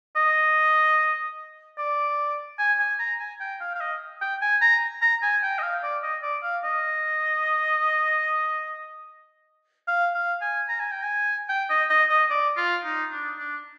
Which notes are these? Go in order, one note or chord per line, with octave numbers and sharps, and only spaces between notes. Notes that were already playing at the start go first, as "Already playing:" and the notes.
D#5
D5
G#5
G#5
A#5
G#5
G5
F5
F5
D#5
G5
G#5
A#5
A#5
G#5
G5
D#5
F5
D5
D#5
D5
F5
D#5
F5
F5
G#5
A#5
G#5
G5
G#5
G5
D#5
D#5
D#5
D5
F4
D#4
D4
D4